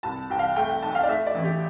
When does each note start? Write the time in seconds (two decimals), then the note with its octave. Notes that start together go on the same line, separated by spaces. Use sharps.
0.03 C2 A5
0.30 C2 G5
0.39 F5
0.56 A3 G5
0.69 G5
0.82 B1 A5
0.95 F5
1.03 D5
1.08 A3 E5
1.26 D5
1.35 A1
1.44 G4